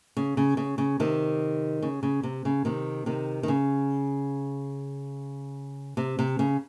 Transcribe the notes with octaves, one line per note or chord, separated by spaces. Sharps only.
C#3
C#3
C#3
C#3
C3 D#3
C#3
C#3
C3
C#3
C3 D#3
C3 D#3
D#3
C#3
C3
C3
C#3